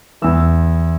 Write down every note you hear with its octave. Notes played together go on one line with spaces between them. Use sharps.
E2 E3 E6